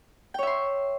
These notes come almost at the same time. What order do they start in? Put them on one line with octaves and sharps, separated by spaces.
G5 C#5 E5 C6